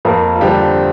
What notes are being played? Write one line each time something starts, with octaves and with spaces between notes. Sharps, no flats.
F2 A#3 A#4
F4
D3 F3 G3 G4